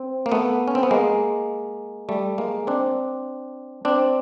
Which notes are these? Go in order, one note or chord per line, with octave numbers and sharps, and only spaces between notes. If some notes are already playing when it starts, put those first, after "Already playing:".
Already playing: C4
A#3
A3 B3
C#4
C4
B3
G#3 A#3
G3 A3
G#3 A#3
C4 D4
C4 D4